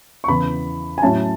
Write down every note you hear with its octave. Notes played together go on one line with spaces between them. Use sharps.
C#6
E2 C#3 E3 B3 B5
G#5
A2 F#3 C#4 E4 A5